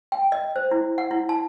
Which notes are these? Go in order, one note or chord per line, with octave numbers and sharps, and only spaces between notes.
G5
D#5
C5
E4
F#5
E4
A5